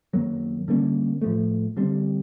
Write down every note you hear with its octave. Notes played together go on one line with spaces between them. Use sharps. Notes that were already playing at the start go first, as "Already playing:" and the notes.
F#2 D#3 F#3 A#3
D3 G3 A#3 C#4
A2 F3 A3
D3 G3 C4